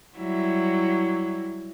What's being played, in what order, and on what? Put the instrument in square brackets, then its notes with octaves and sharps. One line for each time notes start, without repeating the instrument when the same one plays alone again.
[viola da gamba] F#3 G3 E4